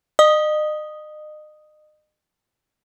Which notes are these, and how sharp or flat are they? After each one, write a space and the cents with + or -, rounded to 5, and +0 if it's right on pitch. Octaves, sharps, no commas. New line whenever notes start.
D#5 -35 D#6 +0